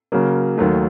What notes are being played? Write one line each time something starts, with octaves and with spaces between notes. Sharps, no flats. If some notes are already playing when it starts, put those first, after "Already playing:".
C#3 F#3 A#3
D#2 D#3 F#3 A3